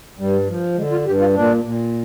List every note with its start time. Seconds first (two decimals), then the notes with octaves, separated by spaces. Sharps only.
0.19 G2 G3
0.48 F3
0.77 D3 G#3
0.91 F4
1.06 G2 G4
1.20 F4
1.34 A#2 D4
1.64 A#2